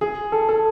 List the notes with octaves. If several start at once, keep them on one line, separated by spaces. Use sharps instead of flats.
G#4
A4
A4